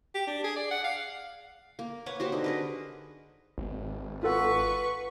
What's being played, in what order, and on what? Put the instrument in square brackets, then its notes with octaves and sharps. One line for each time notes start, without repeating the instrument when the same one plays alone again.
[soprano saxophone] G4
D4
G#4
D5
F#5
F5
[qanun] A#3
B4 C#5 F#5 D6
F#4 G4 C5
D3 D#4
G#4 A#4 B4
[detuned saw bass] G#1
[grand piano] F4 A4 F#5 [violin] B4 C#6